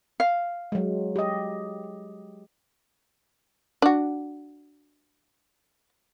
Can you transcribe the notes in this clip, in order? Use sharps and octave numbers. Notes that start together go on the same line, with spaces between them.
F5
F#3 G#3
G4 D#5
D4 F#4